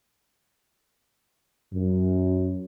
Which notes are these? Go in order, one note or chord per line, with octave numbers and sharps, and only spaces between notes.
F#2